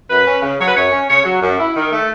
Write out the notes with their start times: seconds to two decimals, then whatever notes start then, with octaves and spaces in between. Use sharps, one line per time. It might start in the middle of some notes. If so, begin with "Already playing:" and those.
0.10 F#2 B4
0.26 C#4
0.42 C#3
0.59 F#3 C#5
0.68 B4
0.75 F#2 C#5
0.92 C#4
1.08 C#3 C#5
1.25 F#3
1.42 F#2
1.59 E4
1.75 D#3
1.92 A3